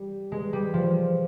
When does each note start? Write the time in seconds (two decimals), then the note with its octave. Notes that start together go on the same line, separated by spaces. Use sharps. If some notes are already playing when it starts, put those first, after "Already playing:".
Already playing: G3
0.32 G#3
0.53 G3
0.74 F3